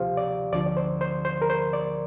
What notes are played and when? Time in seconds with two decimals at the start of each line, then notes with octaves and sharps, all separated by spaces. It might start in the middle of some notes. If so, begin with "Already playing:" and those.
Already playing: D2 C3 F3 F4 G4 C5 F5
0.17 D5
0.53 D2 D3 F3 D5
0.66 D5
0.77 C5
1.01 C5
1.25 C5
1.42 A#4
1.50 C5
1.73 D5